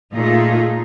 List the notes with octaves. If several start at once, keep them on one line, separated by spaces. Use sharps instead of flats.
A#2 A3 D#4 F4 G#4